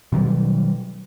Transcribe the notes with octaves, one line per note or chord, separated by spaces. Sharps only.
B2 D#3 F#3 G3